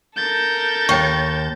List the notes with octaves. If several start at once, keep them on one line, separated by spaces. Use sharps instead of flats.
A4 A#4 G6 A6
D#2 C#5 G5 C#6